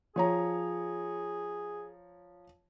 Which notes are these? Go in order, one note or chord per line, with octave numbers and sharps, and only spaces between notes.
F3 G#4 C#5 A#5